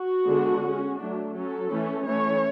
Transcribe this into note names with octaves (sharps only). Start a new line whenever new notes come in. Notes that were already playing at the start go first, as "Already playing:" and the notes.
Already playing: F#4
D3 G#3 B3 D4
G#3 C#4
F#3 A3 D4
F#3 C#4 A4
E3 A3 C#4
E3 A3 C#4 C#5